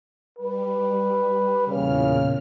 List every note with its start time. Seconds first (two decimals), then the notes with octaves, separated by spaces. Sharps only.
0.38 G3 B4
1.68 E2 A#2 C#3 F6